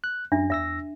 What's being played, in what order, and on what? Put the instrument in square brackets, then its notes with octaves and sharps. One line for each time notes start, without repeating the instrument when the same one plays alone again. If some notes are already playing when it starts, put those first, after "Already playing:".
[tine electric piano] F#6
[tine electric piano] F#2 [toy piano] D4 E5
[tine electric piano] E2 E6 A#6 [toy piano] E5